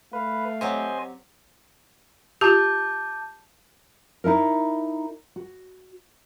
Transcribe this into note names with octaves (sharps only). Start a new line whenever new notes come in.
A3 B4 F5
F#3 C4 G4 C5 D#5 G#5
F4 G4 A5 D6 G6
D#4 E4 A4 A#4
F#4